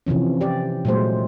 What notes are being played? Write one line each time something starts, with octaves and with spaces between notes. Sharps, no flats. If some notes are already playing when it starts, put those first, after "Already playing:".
C3 E3 F3 C#4
G4 D5
A#2 F#3 G#3 A3 C5